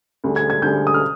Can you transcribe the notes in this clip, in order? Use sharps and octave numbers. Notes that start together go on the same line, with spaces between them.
D2 D3 G3 D4 G#4
G#6
G#6
D2 D3 G3 D4 G#4 G6
D#6
F6